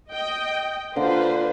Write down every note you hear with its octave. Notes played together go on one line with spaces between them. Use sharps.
D#5 G5
D3 A#3 F4 B4 C5